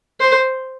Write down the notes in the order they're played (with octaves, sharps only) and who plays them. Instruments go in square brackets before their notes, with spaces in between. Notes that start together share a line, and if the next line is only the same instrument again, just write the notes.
[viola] C5